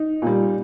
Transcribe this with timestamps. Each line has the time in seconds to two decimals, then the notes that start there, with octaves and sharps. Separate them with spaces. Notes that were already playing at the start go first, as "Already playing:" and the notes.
Already playing: D#4
0.22 A#2 G3